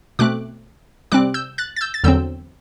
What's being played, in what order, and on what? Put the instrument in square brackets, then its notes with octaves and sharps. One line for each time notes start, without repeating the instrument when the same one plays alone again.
[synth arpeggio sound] B2 A3 C4 D6 F#6
C3 G3 C4 D6 F#6
E6 G6
F#6 A6
A6
E6 G6
A6
E2 D3 F#3 C4 E6 G6